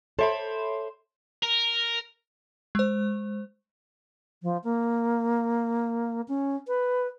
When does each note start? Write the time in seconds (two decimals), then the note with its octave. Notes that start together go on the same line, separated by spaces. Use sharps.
0.19 A4 C5 C#5 E5 B5 D6
1.43 A#4
2.75 G#3 C5
4.43 F3
4.64 A#3
6.28 C#4
6.68 B4